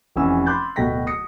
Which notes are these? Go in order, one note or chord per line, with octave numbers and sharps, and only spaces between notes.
F1 C3 E3 C#4 E6
B5 C6 D6 F#6 G6 A6
D1 B2 A3 G5 A#6 B6
D#6 A#6 C#7